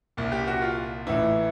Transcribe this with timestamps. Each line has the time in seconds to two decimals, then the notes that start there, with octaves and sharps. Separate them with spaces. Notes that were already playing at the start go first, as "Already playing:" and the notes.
0.17 C2 A#2
0.32 G4
0.47 F#4
0.62 F4
1.07 A1 A2 E3 E4